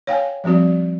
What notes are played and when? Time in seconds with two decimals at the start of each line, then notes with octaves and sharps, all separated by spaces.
0.07 C#5 F5 G5 G#5
0.44 F3 G3 C4 F#4 D5